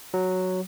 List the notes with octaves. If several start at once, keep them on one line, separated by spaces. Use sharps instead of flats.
F#3